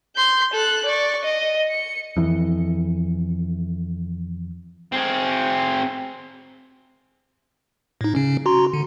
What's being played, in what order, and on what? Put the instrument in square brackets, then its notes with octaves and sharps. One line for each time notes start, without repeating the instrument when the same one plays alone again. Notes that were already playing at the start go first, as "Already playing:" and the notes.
[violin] C6 G6
A4 F#6
D5 C#6
D#5
C#7
[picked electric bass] F2 E3
[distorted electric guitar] C4 G#4
[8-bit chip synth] A2 D#4
C#3 C#4
F#4 A#5 C6
D3